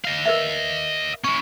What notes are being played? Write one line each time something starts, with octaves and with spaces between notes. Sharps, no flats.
D#5 F5
A#4 B4 E5
C#4 E4 C#6